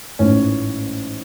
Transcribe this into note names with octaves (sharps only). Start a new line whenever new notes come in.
A1 G#2 E3 C#4